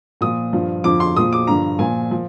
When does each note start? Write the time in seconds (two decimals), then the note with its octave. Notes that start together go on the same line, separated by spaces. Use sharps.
0.21 A#2 F3 D#6
0.53 G2 F3
0.84 F2 D3 F3 D6
1.00 C6
1.16 A#2 F3 D#6
1.33 D6
1.47 G2 D3 F3 A#5
1.79 A#2 F3 G#5
2.11 F3